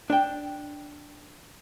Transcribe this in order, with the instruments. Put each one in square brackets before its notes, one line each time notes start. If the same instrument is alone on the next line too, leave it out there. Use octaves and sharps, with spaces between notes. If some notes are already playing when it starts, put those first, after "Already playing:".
[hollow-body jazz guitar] D4 G5